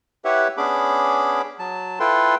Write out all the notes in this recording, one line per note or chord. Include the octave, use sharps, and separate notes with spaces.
E4 G4 B4 C#5 E5 F#5
B3 C#4 D4 G#4 B5 D6
F#3 A5
E4 F4 A4 B4 G5 C6